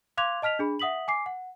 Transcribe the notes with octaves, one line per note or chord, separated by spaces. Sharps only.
F5 C6 D6 F#6 G#6 F7
D#5 A5 F6 B6 F7
D4 G#4 B5
E5 F#5 D#6 B6 F#7
G#5 D6 C7
F#5